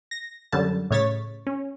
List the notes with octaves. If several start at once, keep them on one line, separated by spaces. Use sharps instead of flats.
A#6
F#2 D3 G3 A5
A2 C#3 C#5 A6 B6
C#4